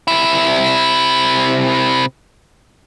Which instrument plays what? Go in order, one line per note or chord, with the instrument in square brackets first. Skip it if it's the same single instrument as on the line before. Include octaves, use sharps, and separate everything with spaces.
[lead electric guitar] C3 E4